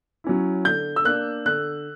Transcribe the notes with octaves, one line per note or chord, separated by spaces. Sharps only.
F#3 C#4 E4
D3 G6
E6
A#3 D4 F#6
D3 F#6